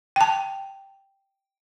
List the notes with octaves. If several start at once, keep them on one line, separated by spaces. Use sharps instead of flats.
G5 A5